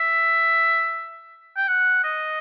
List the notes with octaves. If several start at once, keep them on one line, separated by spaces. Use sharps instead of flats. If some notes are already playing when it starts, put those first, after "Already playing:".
Already playing: E5
G5
F#5
D#5